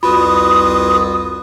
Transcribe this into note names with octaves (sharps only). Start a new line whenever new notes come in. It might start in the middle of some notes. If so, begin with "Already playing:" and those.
C2 F2 F4 F#4 B4 B5 D#6